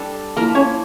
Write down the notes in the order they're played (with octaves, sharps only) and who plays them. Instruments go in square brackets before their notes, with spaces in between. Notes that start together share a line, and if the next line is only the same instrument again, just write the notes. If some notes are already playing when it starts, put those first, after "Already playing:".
Already playing: [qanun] G3 D4 A4
[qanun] F3 A#3 E4 [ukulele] A#4
[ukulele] C#4 C#5